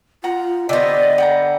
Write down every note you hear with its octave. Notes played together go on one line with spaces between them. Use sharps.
F4 F#5 A#5
D3 B3 G4 C5 D5 D#5
F#5 G5 A#5